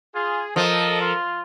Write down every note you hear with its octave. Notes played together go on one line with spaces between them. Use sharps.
F4 G#4
F3 A4 A#4 D#5
F4